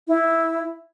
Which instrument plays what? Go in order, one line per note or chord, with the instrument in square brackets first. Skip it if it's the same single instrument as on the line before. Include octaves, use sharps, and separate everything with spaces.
[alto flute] E4